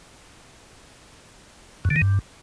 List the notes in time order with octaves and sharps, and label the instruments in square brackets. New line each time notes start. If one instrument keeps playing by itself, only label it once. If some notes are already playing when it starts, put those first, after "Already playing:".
[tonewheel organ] F#2
D3
D#3
G2